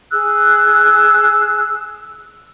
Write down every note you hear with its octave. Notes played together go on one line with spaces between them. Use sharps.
G#4 E6 F#6